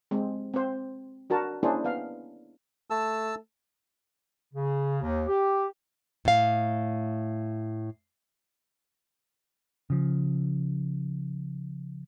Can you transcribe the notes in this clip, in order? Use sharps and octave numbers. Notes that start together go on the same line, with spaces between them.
G#3 C4
C4 C5
D4 F#4 A#4 A5
A#3 C#4 D4 E4 G#4 C5
B3 F5
A3 A5 E6
C#3
D#2
G4
A2 F5
C#3 F3